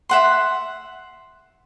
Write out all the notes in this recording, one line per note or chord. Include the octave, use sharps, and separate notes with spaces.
E5 F#5 C6